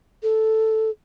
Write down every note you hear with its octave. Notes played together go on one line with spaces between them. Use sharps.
A4